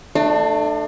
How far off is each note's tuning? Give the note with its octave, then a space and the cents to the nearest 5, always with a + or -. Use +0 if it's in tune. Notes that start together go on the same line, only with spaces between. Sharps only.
A3 +0 D4 +35